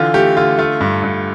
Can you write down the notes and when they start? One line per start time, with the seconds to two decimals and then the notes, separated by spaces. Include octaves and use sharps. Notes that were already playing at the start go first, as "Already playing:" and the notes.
Already playing: D3 E3 F4
0.14 A3 G4
0.37 D3 F4
0.58 A3 F4
0.80 G2
1.03 G2